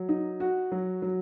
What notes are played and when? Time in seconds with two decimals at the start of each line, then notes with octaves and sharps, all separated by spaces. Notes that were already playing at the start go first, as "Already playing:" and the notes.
Already playing: F#3
0.09 D#4
0.40 F#4
0.72 F#3
1.02 F#3